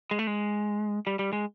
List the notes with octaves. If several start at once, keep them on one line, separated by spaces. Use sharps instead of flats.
G#3
A3
G#3
G3
G3
G#3